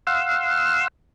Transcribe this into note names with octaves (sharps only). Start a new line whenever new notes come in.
F5 F#5 C6 E6